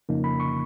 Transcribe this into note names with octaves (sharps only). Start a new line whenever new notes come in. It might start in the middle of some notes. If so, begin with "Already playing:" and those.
F2 C#3 F3 A#3 D#4
B5
C#6